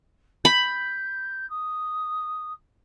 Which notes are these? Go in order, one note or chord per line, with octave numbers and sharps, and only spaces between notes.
B5 G6
D#6